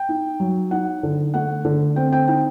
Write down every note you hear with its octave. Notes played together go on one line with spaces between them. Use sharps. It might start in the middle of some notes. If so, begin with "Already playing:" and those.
Already playing: G5
D#4
F#3
D#4 F#5
D3
A3 F#5
D3
C4 G5
G5
D#4 G5